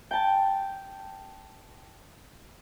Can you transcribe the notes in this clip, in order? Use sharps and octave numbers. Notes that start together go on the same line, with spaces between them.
G5 A5